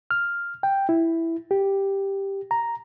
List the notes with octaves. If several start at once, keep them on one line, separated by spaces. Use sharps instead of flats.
F6
G5
E4
G4
A#5